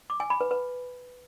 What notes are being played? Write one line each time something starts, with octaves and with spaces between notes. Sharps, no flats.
D6
G#5
B5
B4
B4